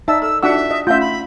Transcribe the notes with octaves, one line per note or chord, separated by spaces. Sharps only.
D#4 D5 E5 A5 E6
A4 E6
D4 D#4 F4 F#4 E5 F#5 E6
D#5
A3 C#4 F4 E5 G6
B5